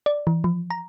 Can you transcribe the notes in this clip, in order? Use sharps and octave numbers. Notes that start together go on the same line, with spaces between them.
D5
E3
F3
A#5